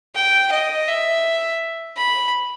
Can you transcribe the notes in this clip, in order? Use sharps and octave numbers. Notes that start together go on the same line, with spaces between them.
G5
D#5
E5
B5